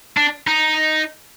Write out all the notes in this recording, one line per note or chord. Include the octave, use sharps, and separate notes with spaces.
D4
D#4